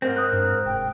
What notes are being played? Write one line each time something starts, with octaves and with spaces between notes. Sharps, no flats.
G#2 G#3 C4 A#4
C5 D#6 F#6
G2
F1 G5